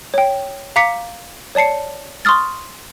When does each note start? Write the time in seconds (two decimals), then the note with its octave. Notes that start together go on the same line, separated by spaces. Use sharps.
0.14 C#5 G5
0.76 F5 A#5 D6 B6 C#7
1.55 C#5 D5 A5 C7 C#7
2.25 C6 C#6 D#6 F6 A6